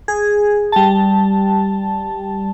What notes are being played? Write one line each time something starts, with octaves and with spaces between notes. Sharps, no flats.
G#4
G3 A5